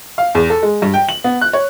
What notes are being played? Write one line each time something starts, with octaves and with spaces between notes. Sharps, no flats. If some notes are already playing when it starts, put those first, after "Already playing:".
F5
E2
A4
G#3
G2
G5
F#7
B3
F#6
C#5